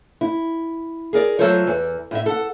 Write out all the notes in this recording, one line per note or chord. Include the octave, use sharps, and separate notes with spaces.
E4
G#4 A#4 D5
F#3 A3 F4 A4 C5 C#5
E2
A2 E5
A4 F#5